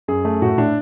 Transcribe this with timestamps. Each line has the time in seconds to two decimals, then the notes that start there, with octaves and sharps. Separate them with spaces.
0.08 F#2 G#4
0.25 A3
0.42 A2 F#4
0.58 A2 D4